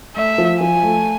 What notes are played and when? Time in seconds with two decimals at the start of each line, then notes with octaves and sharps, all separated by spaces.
0.16 A3 E5
0.38 F3
0.61 F3 G#5
0.83 A3